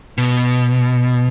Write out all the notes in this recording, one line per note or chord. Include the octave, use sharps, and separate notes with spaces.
B2